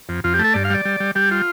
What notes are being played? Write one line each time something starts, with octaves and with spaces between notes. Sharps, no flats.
F2
F2 F4
G4
A3
A4
G2 D5
F5
G3 D5
G3
G3
G3 G4
F4